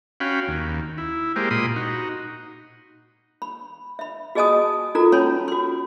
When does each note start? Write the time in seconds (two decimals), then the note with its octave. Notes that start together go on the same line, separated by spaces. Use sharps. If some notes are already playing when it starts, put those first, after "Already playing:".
0.20 C#4 F#4 F5 G5 B5
0.48 D#2
0.98 E4
1.36 G#3 A#3 G4 C5
1.51 A#2 B5 C6 D#6
1.76 D#4 F#4
3.42 B5
3.99 E5 B5
4.35 F#4 G#4 D#5 G#5 A5 D#6
4.95 D#4 F4 F#4 A4 A#4 A#5
5.12 C#4 C#5 G#5 A5 B5 C6
5.48 F#4 C6